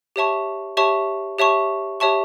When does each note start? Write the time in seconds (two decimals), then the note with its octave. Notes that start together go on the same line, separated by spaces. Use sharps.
0.16 G4 C#5 E5 A5 C#6
0.77 G4 C#5 E5 A5 C#6
1.39 G4 C#5 E5 A5 C#6
2.00 G4 C#5 E5 A5 C#6